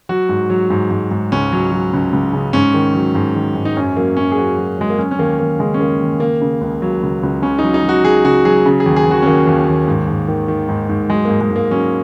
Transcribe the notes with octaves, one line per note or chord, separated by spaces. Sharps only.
F#3 F#4
G#2
F#3
G#2
G#2
G#2
C#2 C#4
F#3
F#3
C#2
C#2
C#3
G#2 C#4
D#3
F#3
G#2
D#3
G#2
D#4
F#2 C#4
F#3 A#3
F#2 C#4
G#4
F#2 F#4
F#3 F#4
F#3 G#3
A#3
F#3 C#4
C#4
D#2 A#3
D#2 A#3
C#3 G#3
C#4
D#2 A#3
D#2
C#3 A#3
C#3
C#2
F#3
C#2
C#2
C#3 C#4
F#3 D#4
D#4
F#3
F#4
F#3 G#4
C#3 F#4
F#3 G#4
C#3
G#4
D#2
G#4
D#2 F#4
C#4
D#2 A#3
D#2
D#2
G#2
G#2
D#3
D#3
G#2
G#2
F#3 G#3
A#3
G#2
G#3
G#2 A#3
F#3 C#4